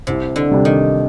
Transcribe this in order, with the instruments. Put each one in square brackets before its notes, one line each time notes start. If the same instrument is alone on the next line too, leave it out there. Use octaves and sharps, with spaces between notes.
[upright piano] C2 [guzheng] C3
[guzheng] D3
[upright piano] C3 G3 D4
[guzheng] D#3